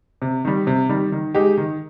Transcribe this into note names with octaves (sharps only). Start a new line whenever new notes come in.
C3
D#3 G3
C3
D#3 G3
D#3
G#3 D#4 G4
D#3